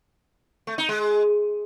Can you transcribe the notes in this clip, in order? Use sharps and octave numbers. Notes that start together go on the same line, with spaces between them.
A3
D#4
G#3